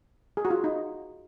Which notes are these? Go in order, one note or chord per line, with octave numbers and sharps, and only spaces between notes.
G#4
F#4
F4
D#4